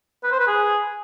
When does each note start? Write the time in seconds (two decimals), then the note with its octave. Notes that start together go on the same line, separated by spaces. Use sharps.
0.24 B4
0.32 C5
0.39 B4
0.47 G#4